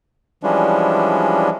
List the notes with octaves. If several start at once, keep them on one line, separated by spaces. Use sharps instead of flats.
E3 F3 G3 G#3 C#4 D4